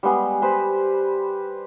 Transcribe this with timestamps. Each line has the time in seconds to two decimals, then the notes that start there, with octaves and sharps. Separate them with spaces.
0.03 G3 G#3 B3 G#4
0.42 G4 B4 C5